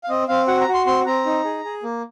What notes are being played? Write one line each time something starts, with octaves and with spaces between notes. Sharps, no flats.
F5
C4 D#5
C4 F5
F#4 F#5
A#5
F#4
C6
C4 C6
C4 A#5
D#4
G#4
G#4
A#3